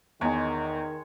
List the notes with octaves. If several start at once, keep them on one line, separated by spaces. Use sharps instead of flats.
E2 D#3 G#3 C#5